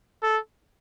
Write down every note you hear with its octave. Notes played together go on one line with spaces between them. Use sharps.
A4